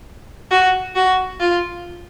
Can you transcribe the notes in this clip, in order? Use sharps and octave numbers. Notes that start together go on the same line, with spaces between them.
F#4
F#4
F4